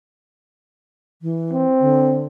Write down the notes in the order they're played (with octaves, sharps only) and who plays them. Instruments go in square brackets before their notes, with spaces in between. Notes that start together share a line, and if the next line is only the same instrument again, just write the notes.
[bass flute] E3
[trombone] C4
[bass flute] D3